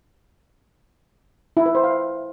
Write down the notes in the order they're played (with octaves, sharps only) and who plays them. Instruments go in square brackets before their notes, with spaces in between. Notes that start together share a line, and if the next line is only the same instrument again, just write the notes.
[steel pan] E4
B4
C5
F5